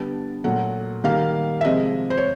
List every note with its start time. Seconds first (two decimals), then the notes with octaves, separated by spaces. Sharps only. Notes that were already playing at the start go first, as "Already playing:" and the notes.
Already playing: D3 G3 B3 A5
0.44 A#2 F#3 A3 F#5
1.04 D#3 G3 A#3 F5
1.61 E5
1.65 C3 F3 G#3 D#5
2.10 C5
2.18 C#5